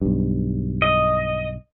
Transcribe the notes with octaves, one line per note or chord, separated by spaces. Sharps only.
B1 G2
D#5